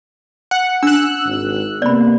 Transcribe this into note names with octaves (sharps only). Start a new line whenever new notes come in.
F#5
D4 E6 F#6
G#1
C3 A#3 B3 D5 B5